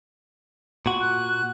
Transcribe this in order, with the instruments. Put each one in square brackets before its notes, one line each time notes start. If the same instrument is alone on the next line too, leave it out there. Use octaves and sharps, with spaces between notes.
[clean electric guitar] A#2 F#4
[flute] F#6